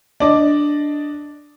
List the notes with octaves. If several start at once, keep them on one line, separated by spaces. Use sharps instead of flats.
D4 D5 D#5